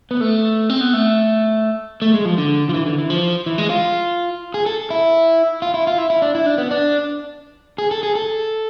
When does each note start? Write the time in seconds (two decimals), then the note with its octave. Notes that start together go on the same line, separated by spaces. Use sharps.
0.11 B3
0.21 A3
0.69 C4
0.81 B3
0.93 A3
2.02 A3
2.14 G#3
2.25 F3
2.38 D3
2.69 F3
2.74 E3
2.86 D3
2.98 E3
3.10 F3
3.46 E3
3.58 G#3
3.70 F4
4.54 G#4
4.66 A4
4.90 E4
5.62 F4
5.74 E4
5.87 F4
5.98 E4
6.10 E4
6.22 D4
6.35 E4
6.46 D4
6.58 B3
6.71 D4
7.78 G#4
7.91 A4
8.03 G#4
8.15 A4